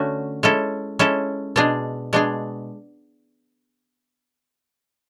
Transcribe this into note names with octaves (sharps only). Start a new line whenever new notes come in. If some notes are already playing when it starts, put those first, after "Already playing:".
Already playing: D3 A3 C#4 F#4
G#3 C#4 E4 A4
G#3 C#4 E4 A4
B2 G#3 D4 G#4
B2 G#3 D4 G#4